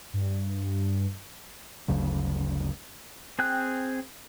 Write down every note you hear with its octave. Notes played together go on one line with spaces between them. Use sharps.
G2
G1 D2 C#3 F#3
C4 G#4 G5 F#6